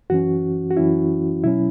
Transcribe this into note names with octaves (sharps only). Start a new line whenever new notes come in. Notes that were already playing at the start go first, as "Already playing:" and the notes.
F#2 E3 C#4 F#4
F#4
F#2 E3 C#4 E4
B2 F#3 C#4 E4